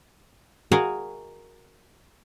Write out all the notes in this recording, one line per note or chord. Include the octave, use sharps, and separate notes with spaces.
F#4 G#4 A#4 D#5 F5